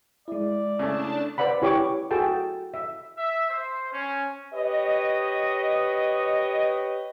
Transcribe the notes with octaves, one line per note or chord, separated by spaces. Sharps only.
G#3 E4 D5
C#3 A3 D4 A5
B4 C5 D5 F#5 B5
E4 G4 C#5 C#6 D6
F#4 G#4 A4 G5 A5
E5
E5
C5
C#4
G4 B4 C#5 D#5